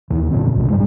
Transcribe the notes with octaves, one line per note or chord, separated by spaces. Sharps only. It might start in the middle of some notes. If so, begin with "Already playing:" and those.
D#2 E3
F#2 A#2 D3 C4
B1 F#2 C3
G#2 G3 G#3